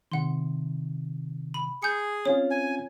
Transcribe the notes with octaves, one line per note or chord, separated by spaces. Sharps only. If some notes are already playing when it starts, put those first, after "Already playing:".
C3 D#3 F#5 C6
B5
G#4 G6 C#7
C4 C#4 F4 C#5
G#5